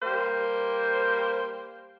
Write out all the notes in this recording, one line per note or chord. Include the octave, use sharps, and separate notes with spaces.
G3 A#3 C5